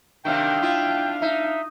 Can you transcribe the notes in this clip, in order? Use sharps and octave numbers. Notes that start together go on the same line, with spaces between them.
C3 D#3 D4 F5 G5
E4 F4
D#4 E5